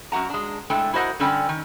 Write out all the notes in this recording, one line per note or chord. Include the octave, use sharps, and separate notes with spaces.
F#2 F#4 F#5 A#5
G#3 D4
A2 G#3 A3 D4 A4 G5
E4 F#4 A#4 C5 D#5 F#5
D3 G3 C#4 A4 D5 G5
D#3